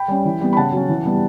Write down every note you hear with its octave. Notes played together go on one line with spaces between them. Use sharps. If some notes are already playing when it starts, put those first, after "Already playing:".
Already playing: G5 B5
G3 C#4
E3
G3 B3
B5
C#3 F#5 A5
F#3 C#4
E3
G3 B3